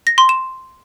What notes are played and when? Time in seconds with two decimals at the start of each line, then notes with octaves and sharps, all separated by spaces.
0.07 A#6
0.18 C6
0.29 E7